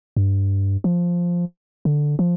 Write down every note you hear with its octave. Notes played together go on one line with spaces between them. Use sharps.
G2
F3
D3
F3